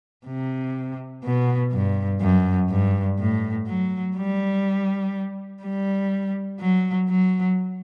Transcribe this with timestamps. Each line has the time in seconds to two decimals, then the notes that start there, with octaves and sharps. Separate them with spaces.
0.27 C3
1.25 B2
1.73 G2
2.21 F#2
2.70 G2
3.19 A2
3.67 F#3
4.17 G3
5.63 G3
6.60 F#3
7.09 F#3